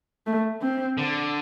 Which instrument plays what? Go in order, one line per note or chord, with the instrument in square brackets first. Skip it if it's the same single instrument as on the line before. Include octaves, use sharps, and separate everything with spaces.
[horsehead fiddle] A3
C4
[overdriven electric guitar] D3